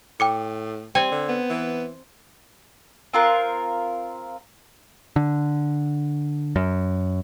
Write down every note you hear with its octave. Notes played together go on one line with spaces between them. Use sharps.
A2 G5 D6 C#7
G3 C4 G5 G#5
D3
B3
E3
C4 F4 A#4 F#6
D3
F#2